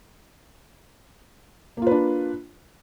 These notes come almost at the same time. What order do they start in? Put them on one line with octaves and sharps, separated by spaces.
A#3 F4 B4 D4